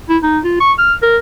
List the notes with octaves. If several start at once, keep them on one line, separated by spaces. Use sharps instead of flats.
E4
D#4
F4
C#6
F6
A#4